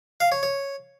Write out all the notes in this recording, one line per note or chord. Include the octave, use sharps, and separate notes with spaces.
F5
C#5
C#5